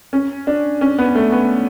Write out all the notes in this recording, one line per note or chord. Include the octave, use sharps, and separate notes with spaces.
C#4
D4
C#4
B3
A3
B3